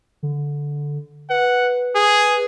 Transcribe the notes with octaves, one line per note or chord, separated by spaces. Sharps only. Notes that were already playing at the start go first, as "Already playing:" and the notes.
D3
B4 F#5
G#4